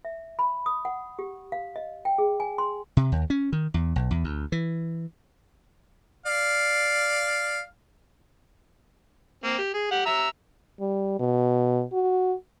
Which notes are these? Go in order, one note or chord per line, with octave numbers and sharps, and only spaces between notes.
E5
B5
D#6
F#5
G4
F5
D#5
G5
G#4
G#5
C6
C3
D#2
C#4
D#3
E2
B1
E2
D2
E3
D5 F5
A#3 C4
G4
G#4
G4 F#5
E5 A#5 E6
G3
B2
F#4